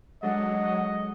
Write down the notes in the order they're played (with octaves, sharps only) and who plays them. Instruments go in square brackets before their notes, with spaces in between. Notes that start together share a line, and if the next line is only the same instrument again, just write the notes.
[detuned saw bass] F#3 [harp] G#3 D4 A4 [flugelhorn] D#5 [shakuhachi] F#5